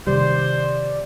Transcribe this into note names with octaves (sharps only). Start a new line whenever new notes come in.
C3 D#3 G3 G4 C5 D5